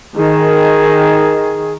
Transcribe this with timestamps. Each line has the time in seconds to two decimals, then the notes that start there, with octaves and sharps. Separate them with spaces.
0.16 D#3 G#4